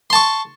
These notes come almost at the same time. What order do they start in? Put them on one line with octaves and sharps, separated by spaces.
C6 A5 C#6